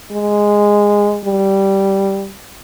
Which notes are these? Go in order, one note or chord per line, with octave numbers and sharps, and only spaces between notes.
G#3
G3